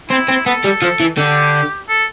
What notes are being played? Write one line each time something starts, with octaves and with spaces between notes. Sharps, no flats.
C4 E4
C4
B3 A4
G3
F3
E3
D3 G4
A4